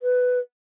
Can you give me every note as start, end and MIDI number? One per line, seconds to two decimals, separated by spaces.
0.02 0.39 71